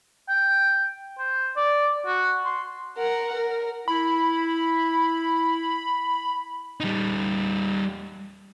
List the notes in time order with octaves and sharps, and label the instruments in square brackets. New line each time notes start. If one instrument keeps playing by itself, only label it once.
[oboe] G5
C5
D5
F#4
C6
[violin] A#4 F#5
A#4
[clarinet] E4 [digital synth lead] B5
[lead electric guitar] G3 D#4